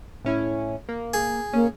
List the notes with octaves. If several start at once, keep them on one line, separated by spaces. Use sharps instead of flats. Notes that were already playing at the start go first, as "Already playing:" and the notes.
A2 C#4 E4
A#3
G#4
A#3 C#4